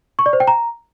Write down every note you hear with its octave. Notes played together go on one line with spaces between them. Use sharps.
C#6
D5
C5
G5
A#5